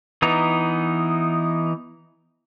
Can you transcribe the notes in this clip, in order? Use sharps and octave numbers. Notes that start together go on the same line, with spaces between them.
E3 B3 D#4 A#5